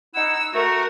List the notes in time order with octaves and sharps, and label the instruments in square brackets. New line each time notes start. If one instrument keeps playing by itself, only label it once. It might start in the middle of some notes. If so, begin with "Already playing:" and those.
[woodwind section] D#4 E4 F#5 [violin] E6
[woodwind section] A3 F#4 [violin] A#4